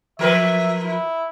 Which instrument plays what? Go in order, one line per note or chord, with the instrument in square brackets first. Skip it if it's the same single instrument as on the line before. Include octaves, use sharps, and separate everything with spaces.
[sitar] F3 A#4 B4 [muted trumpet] E5
[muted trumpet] E4